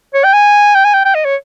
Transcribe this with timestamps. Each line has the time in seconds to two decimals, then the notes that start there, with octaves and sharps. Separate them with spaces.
0.14 C#5
0.24 G5
0.33 G#5
0.75 G5
0.85 G#5
0.94 G5
1.05 G5
1.15 D#5
1.25 C#5